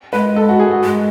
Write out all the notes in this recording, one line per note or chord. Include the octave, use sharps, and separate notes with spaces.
G#3 B4
A4
F#4
G#4
F#4
G#3